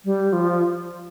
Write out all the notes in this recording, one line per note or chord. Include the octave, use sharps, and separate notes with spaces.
G3
F3